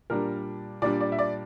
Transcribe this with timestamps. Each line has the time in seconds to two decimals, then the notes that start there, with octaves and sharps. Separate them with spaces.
0.10 A#2 G3 D4 A#4
0.82 A#2 G3 D4 D5
1.00 D5
1.12 E5
1.19 D5